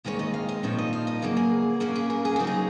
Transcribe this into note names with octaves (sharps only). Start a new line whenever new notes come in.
D#2 D#3 G#3 C4 C#5
D#5
F5
D#5
A#2 F3 C4 D#4 C#5
D#5
F5
D#5
C#3 F#3 A#3 A#4
G#4
C#3 F#3 A#3 C#4 F#4
G#4
A#4
G#4
C#3 F#3 C4 D#4 F#4
G#4